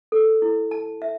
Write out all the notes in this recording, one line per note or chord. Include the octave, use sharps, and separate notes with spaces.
A4
E4
A5
E5